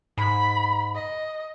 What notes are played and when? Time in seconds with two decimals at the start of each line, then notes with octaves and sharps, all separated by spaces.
0.17 G#2 B5
0.95 D#5